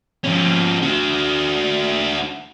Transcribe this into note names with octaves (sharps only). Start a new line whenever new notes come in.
F3 C#4
D4 F#4